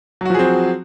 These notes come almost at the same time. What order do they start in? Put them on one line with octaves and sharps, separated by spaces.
F#3 F#4 F3 G#4 C4